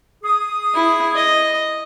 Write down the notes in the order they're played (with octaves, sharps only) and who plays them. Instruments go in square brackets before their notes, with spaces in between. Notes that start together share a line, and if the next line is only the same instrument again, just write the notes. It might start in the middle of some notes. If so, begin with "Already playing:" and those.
[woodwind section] G#4 D#6
[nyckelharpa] E4
D#5